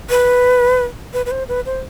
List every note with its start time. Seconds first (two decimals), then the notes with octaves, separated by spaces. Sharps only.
0.10 B4
1.14 B4
1.26 B4
1.31 C5
1.49 B4
1.66 C5